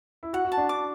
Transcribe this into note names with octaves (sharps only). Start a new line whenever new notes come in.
E4
F#4 F#5
F#4
A5
D4
D6